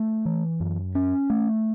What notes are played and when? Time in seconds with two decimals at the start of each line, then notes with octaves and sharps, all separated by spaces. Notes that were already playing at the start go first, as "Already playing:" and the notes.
Already playing: A3
0.25 E3
0.60 F#2
0.95 C#4
1.30 A3